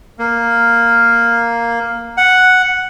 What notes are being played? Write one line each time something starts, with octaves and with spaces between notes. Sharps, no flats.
A#3
F#5